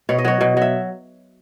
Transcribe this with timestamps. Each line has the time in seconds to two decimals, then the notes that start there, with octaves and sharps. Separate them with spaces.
0.09 B2 C#5
0.18 D#5
0.25 F#3 C#5
0.41 B2
0.57 F#3 E5